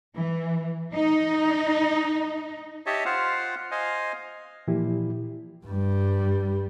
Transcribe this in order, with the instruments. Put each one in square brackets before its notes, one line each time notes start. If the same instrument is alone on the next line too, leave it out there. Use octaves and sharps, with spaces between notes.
[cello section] E3
D#4
[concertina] G4 C#5 D#5 E5 A5
F4 C5 F5 F#5
C5 D#5 F5 G#5
[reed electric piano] A#2 E3 F3 E4 G4
[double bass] G2 G3